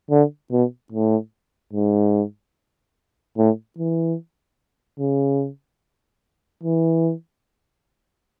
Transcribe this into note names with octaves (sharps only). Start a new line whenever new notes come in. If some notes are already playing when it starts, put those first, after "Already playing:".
D3
B2
A2
G#2
A2
E3
C#3
E3